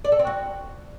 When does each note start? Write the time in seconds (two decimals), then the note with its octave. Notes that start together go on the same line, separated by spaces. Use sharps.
0.05 D5
0.12 A4
0.19 C4
0.27 F#4